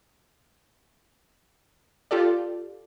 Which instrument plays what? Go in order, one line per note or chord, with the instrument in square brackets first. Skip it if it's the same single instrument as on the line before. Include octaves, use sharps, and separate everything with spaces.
[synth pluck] F4 G4 A4 D5